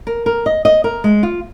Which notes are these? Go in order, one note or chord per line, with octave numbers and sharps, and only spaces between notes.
A#4
A#4
D#5
D#5
A#4
G#3
F4